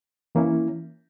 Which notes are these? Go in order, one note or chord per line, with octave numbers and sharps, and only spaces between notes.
E3 A#3 C#4 E4